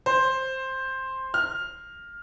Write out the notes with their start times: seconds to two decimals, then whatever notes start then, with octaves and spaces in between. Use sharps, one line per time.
0.06 C5
1.34 F6